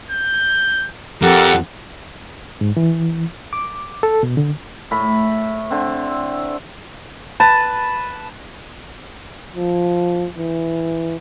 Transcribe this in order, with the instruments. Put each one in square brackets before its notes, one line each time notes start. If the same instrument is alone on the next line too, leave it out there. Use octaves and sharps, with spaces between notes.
[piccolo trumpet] G6
[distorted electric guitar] F2 [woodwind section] G4 A4 F#5 [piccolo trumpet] A#4
[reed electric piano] G#2
E3
D6
A4
B2
D3
[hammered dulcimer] A2 B5
D3 C4
[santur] B4 A5
[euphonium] F3
E3